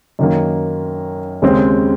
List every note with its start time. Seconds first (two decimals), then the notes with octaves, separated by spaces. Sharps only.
0.19 F#2 D#3 A#3
1.42 D#2 C#3 G#3 C4